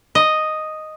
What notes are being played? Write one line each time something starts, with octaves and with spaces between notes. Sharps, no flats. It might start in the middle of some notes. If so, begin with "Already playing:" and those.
D#5